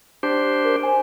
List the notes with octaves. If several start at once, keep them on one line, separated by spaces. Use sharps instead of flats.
D4 G4 C5
A#4
C5 G#5